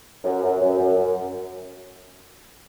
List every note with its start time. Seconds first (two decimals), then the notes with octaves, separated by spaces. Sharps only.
0.24 F#2
0.43 F#2
0.61 F#2
0.78 F#2
0.98 F#2